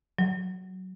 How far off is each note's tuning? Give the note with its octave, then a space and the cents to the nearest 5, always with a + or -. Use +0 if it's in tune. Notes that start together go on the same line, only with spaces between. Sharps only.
F#3 +10